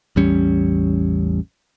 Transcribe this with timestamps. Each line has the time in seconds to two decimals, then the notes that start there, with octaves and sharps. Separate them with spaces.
0.16 A1 E2 G3 C#4